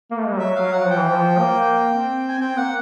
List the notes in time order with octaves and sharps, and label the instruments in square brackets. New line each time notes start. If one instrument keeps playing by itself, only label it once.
[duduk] A#3
A3
G#3
G3
[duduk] F#3 [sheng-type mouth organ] E5
[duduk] F#3 [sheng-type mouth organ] F5
[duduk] F#3 [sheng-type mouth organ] F#5
[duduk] F3
[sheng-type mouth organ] G5
[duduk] E3
F3
A#3
C4
[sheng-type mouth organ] G#5
[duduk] C4 [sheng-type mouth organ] G5
[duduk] A#3 [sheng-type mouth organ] F#5